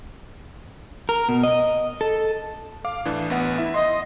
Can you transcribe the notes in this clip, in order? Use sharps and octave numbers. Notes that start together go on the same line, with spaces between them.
A#4
B2
D#5
A4
F5 D6
A2 E3 D4
A1 B3 F#5
E4 E5
D#5 C6